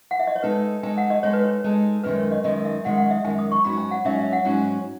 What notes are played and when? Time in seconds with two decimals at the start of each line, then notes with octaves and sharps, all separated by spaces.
0.11 F#5
0.19 E5
0.27 D#5
0.36 C#5
0.43 G#3 D#4 A4 B4
0.83 G#3 D#4 A4 G#5
0.97 F#5
1.10 D#5
1.23 G#3 D#4 A4 C#5
1.33 B4
1.44 C#5
1.64 G#3 D#4 A4
2.03 F#2 D#3 G#3 B4
2.17 C#5
2.31 D#5
2.44 F#2 D#3 G#3 D#5
2.65 E5
2.84 F#2 D#3 G#3 F#5
2.98 F#5
3.06 D#5
3.11 E5
3.24 F#2 D#3 G#3 G#5
3.39 D#6
3.52 C#6
3.64 G#2 F#3 C#4 F#4 B5
3.78 G#5
3.91 F#5
4.05 G#2 F#3 C#4 F#4 E5
4.19 E5
4.33 F#5
4.45 G#2 F#3 C#4 F#4